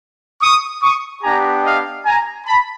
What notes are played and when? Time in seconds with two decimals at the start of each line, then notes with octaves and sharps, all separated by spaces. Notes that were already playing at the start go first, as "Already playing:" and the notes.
0.41 C#6 D#6
0.83 C#6 D#6
1.23 B3 D4 G4 G#5 A#5
1.64 D#5 F5
2.05 G#5 A#5
2.46 A5 B5